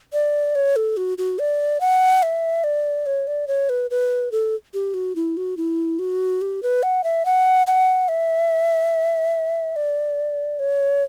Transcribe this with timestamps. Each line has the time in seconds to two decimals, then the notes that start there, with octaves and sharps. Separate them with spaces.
0.13 D5
0.55 C#5
0.76 A4
0.97 F#4
1.18 F#4
1.39 D5
1.81 F#5
2.23 E5
2.64 D5
3.06 C#5
3.27 D5
3.48 C#5
3.69 B4
3.91 B4
4.32 A4
4.74 G4
4.94 F#4
5.16 E4
5.37 F#4
5.57 E4
5.99 F#4
6.42 G4
6.63 B4
6.83 F#5
7.04 E5
7.26 F#5
7.67 F#5
8.09 E5
9.76 D5
10.59 C#5